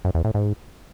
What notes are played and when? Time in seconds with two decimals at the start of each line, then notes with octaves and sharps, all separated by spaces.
0.05 F#2
0.15 E2
0.25 A2
0.34 G#2